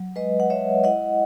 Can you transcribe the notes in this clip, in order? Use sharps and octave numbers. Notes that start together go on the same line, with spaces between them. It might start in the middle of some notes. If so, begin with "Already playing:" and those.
Already playing: F#3
G#3 B4 D#5
F#5
G#3 C#5 E5
E4 D#5 F#5